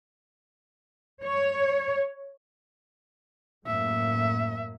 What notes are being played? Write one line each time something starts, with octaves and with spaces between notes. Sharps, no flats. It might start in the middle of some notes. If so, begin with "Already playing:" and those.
C#5
F#2 A2 A#3 E5